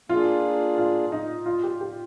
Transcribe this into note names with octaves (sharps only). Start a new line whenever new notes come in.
A#3 D4 F4 G#4
F4
D#4
F4
G4
G4